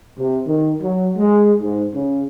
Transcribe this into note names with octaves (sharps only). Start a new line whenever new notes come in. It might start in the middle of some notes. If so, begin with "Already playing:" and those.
C3
D#3
F#3
G#3
G#2
C#3